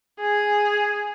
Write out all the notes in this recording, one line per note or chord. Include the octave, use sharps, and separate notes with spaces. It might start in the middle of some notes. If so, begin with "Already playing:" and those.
G#4